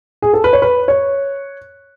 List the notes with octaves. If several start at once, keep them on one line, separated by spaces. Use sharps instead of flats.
G#4
A4
B4
C#5
B4
C#5